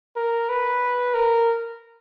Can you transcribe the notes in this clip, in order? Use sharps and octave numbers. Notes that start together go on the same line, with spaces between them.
A#4
B4
A#4